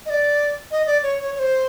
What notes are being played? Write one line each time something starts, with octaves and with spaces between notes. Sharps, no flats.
D#5
D5
D#5
D5
C#5
C#5
C#5
C5